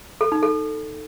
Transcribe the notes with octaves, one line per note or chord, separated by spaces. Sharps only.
A4
D#4
A4